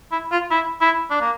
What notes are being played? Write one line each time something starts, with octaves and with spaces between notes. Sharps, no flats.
E4
F4
E4
E4
D4
A#3